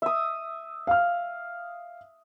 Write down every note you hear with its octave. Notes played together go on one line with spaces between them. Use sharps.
E5 D#6
F5 F6